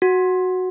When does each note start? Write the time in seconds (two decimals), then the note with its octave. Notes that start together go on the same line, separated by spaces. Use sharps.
0.02 F#4